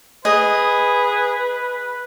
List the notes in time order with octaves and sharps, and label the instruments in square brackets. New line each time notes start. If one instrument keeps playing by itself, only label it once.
[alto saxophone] G#4 [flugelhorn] B4 [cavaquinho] D#5